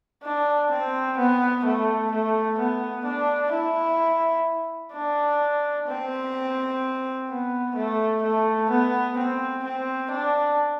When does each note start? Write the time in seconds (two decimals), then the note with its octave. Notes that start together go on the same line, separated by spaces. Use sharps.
0.23 D4
0.71 C4
1.18 B3
1.65 A3
2.12 A3
2.58 B3
3.05 D4
3.52 E4
4.93 D4
5.88 C4
7.29 B3
7.75 A3
8.23 A3
8.70 B3
9.17 C4
9.64 C4
10.11 D4